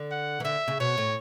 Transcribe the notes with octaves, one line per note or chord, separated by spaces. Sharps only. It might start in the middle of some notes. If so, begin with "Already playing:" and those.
Already playing: D3
F#5
E3
D3 E5
C#3
B2 C#5
A2